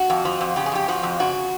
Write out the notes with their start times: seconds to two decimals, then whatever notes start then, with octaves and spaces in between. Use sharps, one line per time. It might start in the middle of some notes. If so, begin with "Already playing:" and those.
Already playing: F#4
0.10 F2
0.25 F3
0.41 F2
0.56 C#3 G4
0.66 G#4
0.72 F2 G4
0.88 F3 F#4
1.03 F2
1.19 C#3 F#4